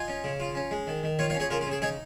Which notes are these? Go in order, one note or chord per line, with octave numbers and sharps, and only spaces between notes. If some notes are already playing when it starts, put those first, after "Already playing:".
Already playing: F4 D#5 G#5
C#4
C#3
F4
C#4
G#3
D#3
D#3
F4 C#5 F5
C#5 F5
C#4
G#4 C#5
C#3 F4 A#4
F4
C#3
G#4
D#4 G#4 C#5